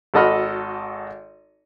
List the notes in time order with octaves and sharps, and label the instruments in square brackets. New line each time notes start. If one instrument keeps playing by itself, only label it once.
[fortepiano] G#1 F#4 A4 D#5 B5 F6